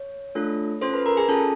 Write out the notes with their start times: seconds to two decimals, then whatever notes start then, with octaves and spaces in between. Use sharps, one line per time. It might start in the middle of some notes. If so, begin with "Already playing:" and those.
Already playing: C#5
0.35 A3 D4 F4 A4
0.81 C#4 F4 A4 C5 C6
0.94 B4 B5
1.06 A#4 A#5
1.17 G#4 G#5
1.29 C#4 F4 A4 A5